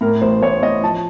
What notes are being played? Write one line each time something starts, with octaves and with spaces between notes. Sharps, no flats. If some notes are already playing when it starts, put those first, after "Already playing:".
A2 A#4
A1 C5
A1 C#5
A2 D#5
F3 A5